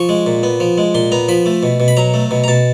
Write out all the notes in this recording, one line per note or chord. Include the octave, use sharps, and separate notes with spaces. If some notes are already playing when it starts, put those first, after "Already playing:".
Already playing: F3 C#6
G#3
A#2
B3
F3
G#3
A#2 C6
B3 A#5
F3 B5
A3
B2
B2
B5
F#3 A#5
A3
B2
A#5
B2 A5